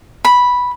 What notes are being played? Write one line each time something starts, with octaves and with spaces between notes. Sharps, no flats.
B5